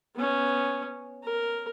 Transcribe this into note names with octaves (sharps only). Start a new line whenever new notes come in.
B3 C#4
A#4